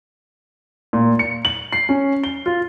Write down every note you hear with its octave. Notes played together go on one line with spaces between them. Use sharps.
A#2
C#7
F#7
C7
C#4
G7
F4